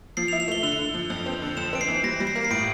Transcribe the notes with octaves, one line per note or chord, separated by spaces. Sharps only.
F3 C7
F7
E4
F7
A3 G7
D3 F7
D3
F3
F2
C4
D3
F2 E7
C4 D7
C7
E3
G3 A#6
G3
C7
A#3
C7
A2 D7